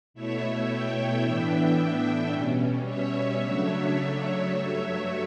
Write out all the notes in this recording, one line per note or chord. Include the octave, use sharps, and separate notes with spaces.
B2 A3 E4 C#5 E5
E5 G5
A2 E3 B3 D4
B2 G3 C#4
C#5 E5
C#3 F#3 A3 D4
G2 F#3 A3